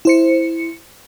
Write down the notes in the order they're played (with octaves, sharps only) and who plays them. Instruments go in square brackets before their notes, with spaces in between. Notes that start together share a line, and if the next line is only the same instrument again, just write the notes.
[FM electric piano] E4 C5 C#7